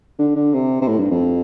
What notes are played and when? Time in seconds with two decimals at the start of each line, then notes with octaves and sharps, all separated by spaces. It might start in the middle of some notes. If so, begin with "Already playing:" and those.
0.19 D3
0.36 D3
0.54 C3
0.81 C3
0.88 A2
0.99 G2
1.11 F2